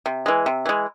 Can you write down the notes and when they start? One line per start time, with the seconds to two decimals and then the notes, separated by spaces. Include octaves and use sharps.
0.06 C3
0.26 E3 G#3
0.46 C3
0.66 E3 G#3